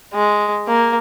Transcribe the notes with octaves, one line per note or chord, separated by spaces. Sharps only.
G#3
A#3